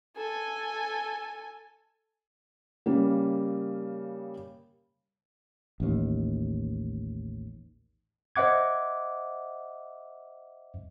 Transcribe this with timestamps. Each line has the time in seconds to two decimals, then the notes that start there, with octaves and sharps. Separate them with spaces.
0.17 A4 G#5
2.86 C#3 G3 A#3
5.80 A1 D#2
8.36 C5 D#5 E5 F#5 D6 G#6